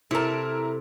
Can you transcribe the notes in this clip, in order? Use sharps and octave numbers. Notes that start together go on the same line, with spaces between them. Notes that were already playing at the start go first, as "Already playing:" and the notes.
C3 E4 A4 A#4 A5